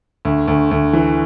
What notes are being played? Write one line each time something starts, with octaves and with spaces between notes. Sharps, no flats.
D2
D2
D2
E3